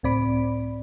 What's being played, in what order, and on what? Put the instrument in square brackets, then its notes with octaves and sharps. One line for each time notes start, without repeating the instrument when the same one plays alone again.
[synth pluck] C#2 A2 C4 D5 B5 D7